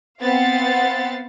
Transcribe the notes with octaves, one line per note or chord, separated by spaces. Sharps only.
B3 C4 F5 F#5 A6